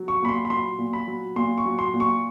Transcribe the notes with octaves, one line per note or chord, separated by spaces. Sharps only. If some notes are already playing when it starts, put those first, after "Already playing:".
Already playing: F#3
C#6
A#2 B5
C6
B5
F#3 C6
A#2
B5
F#3
A#2 C6
C#6
F#3
C6
A#2
C#6